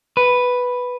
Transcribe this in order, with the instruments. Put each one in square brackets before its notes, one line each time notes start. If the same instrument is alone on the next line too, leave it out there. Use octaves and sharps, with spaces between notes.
[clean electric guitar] B4